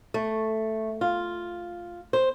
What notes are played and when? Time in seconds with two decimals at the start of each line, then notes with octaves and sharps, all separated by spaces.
0.14 A3
1.01 F4
2.13 C5